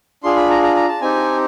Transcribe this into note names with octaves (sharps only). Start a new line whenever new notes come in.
D4 F4 G#4 C6
B5
A#5
A#5
A#5
A5
C4 D#4 G4 G#5